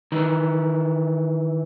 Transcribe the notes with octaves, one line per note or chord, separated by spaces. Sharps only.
D#3 E3